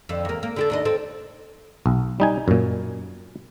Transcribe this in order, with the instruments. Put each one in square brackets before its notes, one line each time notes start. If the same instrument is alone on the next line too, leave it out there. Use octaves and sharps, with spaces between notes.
[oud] F2 D3
E2 A#3
A#3
D3 G4 A4
D#2 D4 D#5
C4 A4
[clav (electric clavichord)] B1
G3 D#4 G#5
F#2 A#2